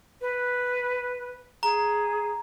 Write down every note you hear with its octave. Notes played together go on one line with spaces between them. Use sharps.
B4
G#4 A#5